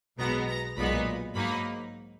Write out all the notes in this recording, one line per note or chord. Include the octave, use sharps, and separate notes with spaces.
B1 B2 G#3 B3 A#5
A#5
B1 A#2 G#3 B3 D#4 B5
G#2 F#3 A#3 D#4 B5